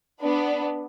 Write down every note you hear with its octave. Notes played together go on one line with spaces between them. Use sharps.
B3 D4